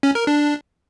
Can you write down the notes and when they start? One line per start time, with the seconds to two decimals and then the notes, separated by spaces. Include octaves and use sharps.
0.03 C#4
0.15 A#4
0.27 D4